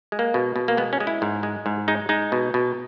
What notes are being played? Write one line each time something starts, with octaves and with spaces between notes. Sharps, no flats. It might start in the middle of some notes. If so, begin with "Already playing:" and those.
G#3
A#3
B2
B2
A#3
G#3 B3
C#4
G#3
E4
G#2
G#3
G#2
G#3 D#4
G#3 D#4
B2
B2